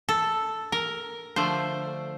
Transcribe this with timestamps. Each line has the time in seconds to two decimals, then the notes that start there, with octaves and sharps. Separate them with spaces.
0.09 A4
0.72 A#4
1.36 D3 F3 A3 C5